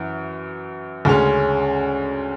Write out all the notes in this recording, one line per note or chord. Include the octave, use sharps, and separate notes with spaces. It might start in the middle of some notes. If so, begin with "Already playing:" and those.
Already playing: F#2 E3
D2 C#3 G#3 C#4